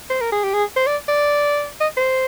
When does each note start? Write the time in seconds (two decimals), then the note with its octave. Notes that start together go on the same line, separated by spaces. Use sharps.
0.10 C5
0.21 A#4
0.32 G#4
0.44 G4
0.54 G#4
0.76 C5
0.87 D5
1.08 D5
1.80 D#5
1.97 C5